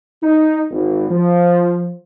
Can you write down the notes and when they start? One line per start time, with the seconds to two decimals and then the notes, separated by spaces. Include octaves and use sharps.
0.22 D#4
0.71 G#1
1.11 F3